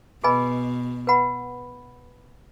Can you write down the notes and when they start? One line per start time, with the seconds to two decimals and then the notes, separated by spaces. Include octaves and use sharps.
0.24 B2 G#4 B4 D#5 G#5 B5
1.07 B4 F#5 B5